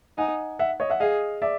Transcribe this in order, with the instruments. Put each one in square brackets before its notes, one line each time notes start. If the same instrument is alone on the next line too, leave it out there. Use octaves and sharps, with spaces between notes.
[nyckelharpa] D#4 [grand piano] F#5 G#5
[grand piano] E5 F#5
C#5 D#5
E5 F#5
[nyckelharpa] G#4 [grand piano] D#5 F5
[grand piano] D5 E5